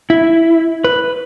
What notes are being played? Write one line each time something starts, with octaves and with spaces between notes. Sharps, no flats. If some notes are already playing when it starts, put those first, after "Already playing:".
E4
B4